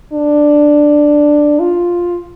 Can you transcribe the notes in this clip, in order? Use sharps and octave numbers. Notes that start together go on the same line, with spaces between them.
D4
F4